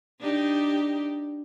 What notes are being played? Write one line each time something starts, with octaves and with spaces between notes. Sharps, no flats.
D4 D#4 G4